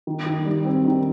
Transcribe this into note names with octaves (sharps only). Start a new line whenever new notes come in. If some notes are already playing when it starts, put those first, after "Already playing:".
D#3
D#3
G3
C4
D#3